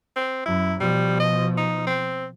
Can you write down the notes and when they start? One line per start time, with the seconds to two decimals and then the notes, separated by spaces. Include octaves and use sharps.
0.16 C4
0.46 F#2 E4
0.80 B2 F3 G3
1.20 D#5
1.57 D#4
1.87 C4